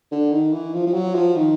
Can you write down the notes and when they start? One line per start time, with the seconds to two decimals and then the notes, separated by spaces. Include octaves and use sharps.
0.12 D3
0.33 D#3
0.53 E3
0.74 F3
0.87 F3
0.94 F#3
1.15 F3
1.36 D#3